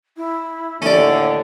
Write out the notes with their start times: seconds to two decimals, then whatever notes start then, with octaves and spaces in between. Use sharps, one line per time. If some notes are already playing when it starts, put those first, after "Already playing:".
0.17 E4
0.82 D#2 A2 D3 C#4 D5 E5